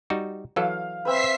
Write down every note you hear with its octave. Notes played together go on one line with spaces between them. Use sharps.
G3 D#4 F#4
E3 F#3 A4 F5
C4 B4 E5 B6 C7